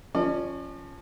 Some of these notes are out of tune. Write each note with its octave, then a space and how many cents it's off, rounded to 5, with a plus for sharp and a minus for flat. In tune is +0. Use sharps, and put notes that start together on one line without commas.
F3 +0 C#4 +0 D5 +45